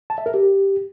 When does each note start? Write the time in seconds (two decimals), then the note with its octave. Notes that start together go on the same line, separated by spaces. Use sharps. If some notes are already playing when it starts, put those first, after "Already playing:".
0.10 A5
0.18 E5
0.26 A#4
0.34 G4